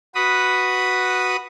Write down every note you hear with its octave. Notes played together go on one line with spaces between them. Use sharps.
F#4 B4 B5 D#6